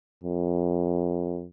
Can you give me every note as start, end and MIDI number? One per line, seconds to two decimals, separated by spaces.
0.24 1.47 41